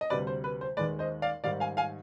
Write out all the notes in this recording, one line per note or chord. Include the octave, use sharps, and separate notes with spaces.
D#5
D2 C3 G3 B4 D5
C5
B4
C5
D#2 D#3 G#3 B4 D5
C5 D#5
D5 F5
G#2 D#3 G3 D5 F5
F5 G#5
F5 G#5